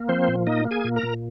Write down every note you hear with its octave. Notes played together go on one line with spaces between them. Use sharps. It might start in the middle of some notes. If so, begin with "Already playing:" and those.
Already playing: A#3
F3 C4 C5
A#2
A#3 D#4 D#5
A#3
G#4 G#5
A#2
A#4 A#5
A#2